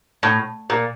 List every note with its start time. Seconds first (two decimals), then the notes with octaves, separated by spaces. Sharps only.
0.23 A2
0.70 A#2